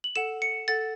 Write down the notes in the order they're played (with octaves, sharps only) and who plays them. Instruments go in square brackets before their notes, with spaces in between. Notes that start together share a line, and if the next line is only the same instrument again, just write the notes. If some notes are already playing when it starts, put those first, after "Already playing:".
[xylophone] F#7
A4 F#5 E7
C#7
A4 F#5 A6